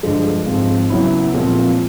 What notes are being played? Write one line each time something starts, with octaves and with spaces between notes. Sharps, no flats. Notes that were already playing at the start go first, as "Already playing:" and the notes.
G2 D3 F3 G#3
G#2 F3 G#3 C4 F4
C#3 F#3 B3 E4
A#2 F3 G#3 C4 F4